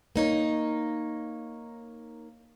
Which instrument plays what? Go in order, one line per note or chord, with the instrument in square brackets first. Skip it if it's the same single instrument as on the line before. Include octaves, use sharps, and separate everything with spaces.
[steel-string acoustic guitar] A#3 D#4 C#5